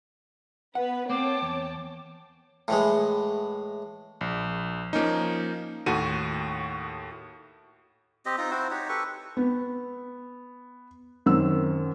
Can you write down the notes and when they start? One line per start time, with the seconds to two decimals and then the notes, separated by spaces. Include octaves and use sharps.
0.75 B3 B4 F#5
1.09 A#3 C4 C#5 G5 A5 D6
1.42 E2
2.68 A2 E3 G#3
4.21 A#1
4.93 F3 A#3 C#4 D#4
5.86 D#2 A2 F#4 A4 D#7
8.26 C4 G4 D#5
8.38 C4 D#4 F4 A#5
8.51 C4 E4 F#4 C5
8.71 D#4 F#4 G4 C#5
8.89 G4 A4 B4 C#6
9.37 B3
11.26 F#2 D#3 C4 E6